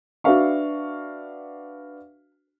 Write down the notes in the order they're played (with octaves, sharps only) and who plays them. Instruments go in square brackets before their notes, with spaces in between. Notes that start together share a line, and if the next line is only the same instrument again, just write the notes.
[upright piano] D4 F#4 B4 E5 F5 C#6